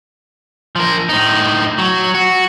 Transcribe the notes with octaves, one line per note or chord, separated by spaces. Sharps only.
F3 A#4
A2 D#4
F#3
F#4